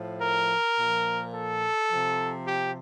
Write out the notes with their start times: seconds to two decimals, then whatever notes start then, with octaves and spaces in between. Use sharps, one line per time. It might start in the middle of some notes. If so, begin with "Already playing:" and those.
Already playing: A2 F3
0.22 A#4
0.78 A#2 F3
1.34 A4
1.90 C3 F3
2.47 G4